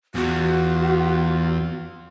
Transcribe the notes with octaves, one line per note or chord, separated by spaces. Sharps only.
E2 F4 F#4